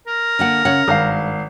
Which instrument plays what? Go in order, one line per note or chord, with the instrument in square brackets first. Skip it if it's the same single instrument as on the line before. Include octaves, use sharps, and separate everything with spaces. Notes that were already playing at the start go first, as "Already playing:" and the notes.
[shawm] A#4
[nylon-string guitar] D3 A#3 F#5
C#3 C#5 F#5
[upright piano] G#1 F5 [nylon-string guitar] G2